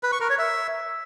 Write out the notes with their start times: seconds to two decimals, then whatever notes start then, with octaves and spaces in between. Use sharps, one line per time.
0.03 B4
0.12 C#6
0.21 A#4
0.30 C#5
0.39 E5